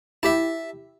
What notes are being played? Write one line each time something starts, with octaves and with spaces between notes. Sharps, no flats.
E4 G4 E5 A5